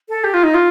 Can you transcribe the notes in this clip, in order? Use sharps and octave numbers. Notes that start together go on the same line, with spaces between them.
A4
G4
F4
D#4
F4